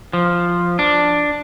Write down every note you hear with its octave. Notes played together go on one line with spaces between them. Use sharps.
F3
D4